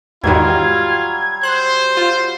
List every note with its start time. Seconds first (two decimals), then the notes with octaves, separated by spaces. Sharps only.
0.24 E2 G#2 D#3 F#3 G3 F4 G#6
1.43 C5 F#6
1.97 F4